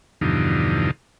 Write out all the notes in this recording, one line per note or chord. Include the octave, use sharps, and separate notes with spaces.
E2 G2 B2 D3 F3 D#4